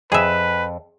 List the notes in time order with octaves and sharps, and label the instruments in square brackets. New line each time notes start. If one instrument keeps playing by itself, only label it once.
[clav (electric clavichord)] F2 [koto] G#4 E5 [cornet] B4